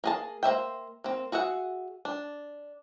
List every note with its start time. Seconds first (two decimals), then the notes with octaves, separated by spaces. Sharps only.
0.04 A#3 G#4 A5
0.43 A#3 C5 E5 G5
1.04 A#3 C4
1.32 F#4 G#4 E5 F#5
2.05 D4